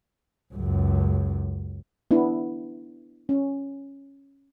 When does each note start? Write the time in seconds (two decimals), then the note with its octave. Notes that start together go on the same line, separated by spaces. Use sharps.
0.54 C#2 F#2
2.11 B3 D4 E4
3.29 C#4